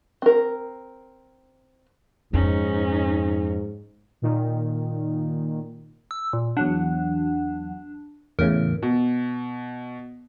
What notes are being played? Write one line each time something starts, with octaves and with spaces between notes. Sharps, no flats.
C4 A#4
F2 G#2 C#4 D#4
A#2 D#3
E6
A#2
E2 F#3 D4 F#5
E2 A2 C#3 A#4
B2